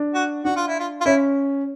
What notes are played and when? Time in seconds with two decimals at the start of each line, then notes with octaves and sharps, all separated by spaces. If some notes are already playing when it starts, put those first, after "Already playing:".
Already playing: D4
0.15 F#4
0.45 D4 F#4
0.56 F4
0.68 E4
0.80 F4
1.01 F4
1.06 C#4 E4